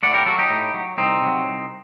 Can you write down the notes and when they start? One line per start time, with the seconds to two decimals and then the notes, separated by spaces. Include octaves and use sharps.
0.03 A2 D5 F#5
0.14 G4 A#4
0.26 F#3 F#4 A4
0.39 D#4 G4
0.50 A2
0.74 F#3
0.98 C2 C4 D#4
1.22 C3 D#3 F#3
1.47 C2